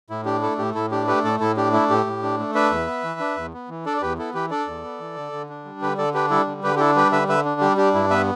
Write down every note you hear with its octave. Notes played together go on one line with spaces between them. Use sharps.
A2 E4
D4 G4
A3 E4 A4
A2 G4
A2 E4 A4
D4 G4
A3 G4 B4
A2 A4 D5
A2 E4 A4
D4 G4
A3 E4
A2 G4
A2
D4
A3
D4 B4 E5
E2
B3
E3
D4
E2
B3
E3
D4 A4 D5
D5
E2 G4 B4
B3 E4 A4
E3 G4 B4
D4 A4 D5
E2
B3
E3
D3
D3
D4
G3
D3 G4 B4
D3 A4 D5
D4 G4 B4
G3 E4 A4
D3
D3 G4 B4
G4
D4 E4 A4
G3 G4 B4
D3 B4 E5
D3 B4 E5
D4
G3 G4
D4 G4
G2 E4
B3 B4 E5